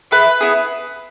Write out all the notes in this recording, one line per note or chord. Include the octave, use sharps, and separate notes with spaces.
B3 E4 G#4 B4
B3 E4 G#4